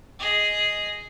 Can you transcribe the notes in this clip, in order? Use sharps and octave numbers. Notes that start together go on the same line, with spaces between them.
G#4 D#5